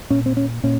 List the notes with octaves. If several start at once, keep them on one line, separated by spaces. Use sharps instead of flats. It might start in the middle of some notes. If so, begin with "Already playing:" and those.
A#2 C#4
C4
C#4
A#2 C#4